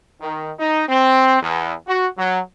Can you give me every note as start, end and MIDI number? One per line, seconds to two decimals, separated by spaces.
0.21 0.51 51
0.59 0.84 63
0.88 1.39 60
1.40 1.73 40
1.87 2.05 66
2.17 2.39 54